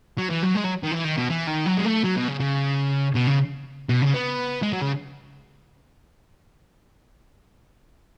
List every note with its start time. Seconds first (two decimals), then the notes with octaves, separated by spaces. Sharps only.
0.18 F#3
0.30 E3
0.42 F#3
0.55 G#3
0.64 F#3
0.83 D#3
0.91 E3
1.05 D#3
1.17 B2
1.29 E3
1.47 D#3
1.66 F#3
1.77 G#3
1.85 A3
2.04 F#3
2.16 B2
2.28 C#3
2.40 C#3
3.15 B2
3.27 C#3
3.89 B2
4.02 C#3
4.14 B3
4.63 G#3
4.73 F#3
4.82 C#3